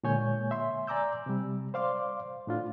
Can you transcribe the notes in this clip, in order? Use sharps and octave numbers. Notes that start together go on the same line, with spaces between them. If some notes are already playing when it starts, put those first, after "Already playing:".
A#2 D3 G#3 C#5 G#5 G6
E5 C6
D5 G#5 A#5 D6 E6 G6
C3 G3
C5 D5 F5 C6 D6
A2 D4 F4